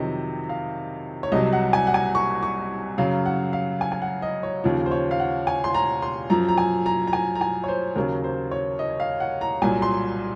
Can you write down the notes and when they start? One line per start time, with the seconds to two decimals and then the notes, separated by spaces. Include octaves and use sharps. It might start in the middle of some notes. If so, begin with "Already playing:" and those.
Already playing: F2 C3 D#3 F#3 D#5
0.49 F5
1.23 C#5
1.32 C2 C3 F#3 D#5
1.53 F#5
1.73 G#5
1.87 F#5
1.94 G#5
2.15 C#6
2.43 C#6
2.98 F#2 C#3 F#3 F5
3.26 F#5
3.53 F5
3.81 G#5
3.92 G#5
4.02 F#5
4.22 D#5
4.43 C#5
4.64 D#2 C#3 F3
4.86 C5
4.91 C#5
5.11 F5
5.20 F#5
5.47 G#5
5.64 C6
5.75 A#5
6.02 C6
6.30 F#2 F3 A#5
6.48 A#5
6.58 G#5
6.86 A#5
7.07 A#5
7.13 G#5
7.35 A#5
7.41 G#5
7.64 C#5
7.68 C5
7.96 D#2 C#3 F#3 A#4
8.24 C5
8.51 C#5
8.79 D#5
9.00 F5
9.20 F#5
9.41 A#5
9.62 C2 A#2 F#3 G#5
9.82 C6